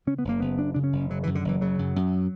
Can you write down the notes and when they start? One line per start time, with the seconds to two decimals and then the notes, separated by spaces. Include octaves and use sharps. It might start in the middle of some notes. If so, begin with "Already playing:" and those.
0.07 C#3 C#4
0.18 B3
0.24 F#1 A#3
0.40 F#1 B3
0.58 F#2 D4
0.74 C#3 D4
0.84 C#4
0.93 F#1
1.10 C#3 F#3
1.23 F#2 E3
1.35 D3
1.45 F#1 E3
1.61 C#3 F#3
1.79 F#2
1.96 F#2